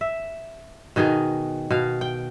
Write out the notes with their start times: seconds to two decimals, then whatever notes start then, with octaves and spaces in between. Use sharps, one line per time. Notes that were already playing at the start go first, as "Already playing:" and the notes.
0.01 E5
0.96 B2 D#3 D#4 G#4
1.70 B2 F5
2.01 G5